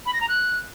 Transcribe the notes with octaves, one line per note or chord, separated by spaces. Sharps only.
B5
A#6
A#5
F#6